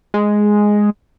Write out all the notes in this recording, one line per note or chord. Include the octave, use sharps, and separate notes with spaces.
G#3